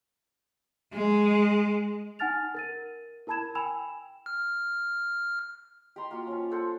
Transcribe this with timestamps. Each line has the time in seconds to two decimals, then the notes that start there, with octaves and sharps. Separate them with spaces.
0.93 G#3
2.19 D#4 F#5 G#5 F6 A6 F7
2.55 A#4 A6 D#7
3.27 E4 A#4 A5 B5 G#6 E7
3.55 G5 G#5 B5 E6 E7 F7
4.26 F6
5.96 G4 D#5 A#5 C6
6.11 A#3 F4 F#4
6.27 F3 C#4
6.50 A4 C5 F#5